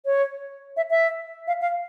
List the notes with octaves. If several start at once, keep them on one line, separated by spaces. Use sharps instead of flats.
C#5
E5
E5
F5
F5